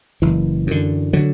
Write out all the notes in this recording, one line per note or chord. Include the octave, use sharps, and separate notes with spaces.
F#1 E3
F#2 D3
D3 F#3